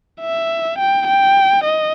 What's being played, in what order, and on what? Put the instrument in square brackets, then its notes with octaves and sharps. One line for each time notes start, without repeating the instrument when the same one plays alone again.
[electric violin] E5
G5
G5
D#5